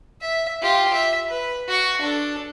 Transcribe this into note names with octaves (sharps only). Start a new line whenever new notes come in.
E5
F4 G4
E5
B4
F#4 C#6
D4 A4